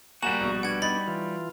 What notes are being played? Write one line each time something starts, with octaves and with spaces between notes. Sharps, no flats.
G3 A#3 F#4 F#5 G#5 A#5 E7
A#1 B2
B3 D4 F#5 G#6
D#4 B5 A6
E3 F4